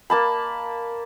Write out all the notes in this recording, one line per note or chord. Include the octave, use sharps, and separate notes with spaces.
A#3 A5 B5